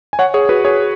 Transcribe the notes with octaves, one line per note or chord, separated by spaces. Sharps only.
G#5
C#5 F#5
G#4 C#5
F#4 B4
G#4 C#5